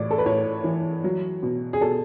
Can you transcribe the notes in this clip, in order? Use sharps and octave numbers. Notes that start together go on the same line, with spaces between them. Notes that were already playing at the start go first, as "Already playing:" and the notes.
Already playing: A2 E3 D5
A4
B4
A2 C#5
E3
F#3
B2
G#4
B2 A4